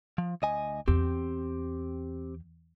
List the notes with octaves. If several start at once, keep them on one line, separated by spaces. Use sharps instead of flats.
F3
D2 D#5 G#5
E2 C4 G4